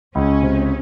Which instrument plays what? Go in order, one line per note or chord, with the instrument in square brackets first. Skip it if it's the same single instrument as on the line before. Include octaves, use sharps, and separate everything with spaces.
[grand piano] C#2 [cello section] C#4
[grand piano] C3